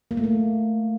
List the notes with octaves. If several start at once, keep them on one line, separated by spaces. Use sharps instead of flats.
A#3
A3
A#3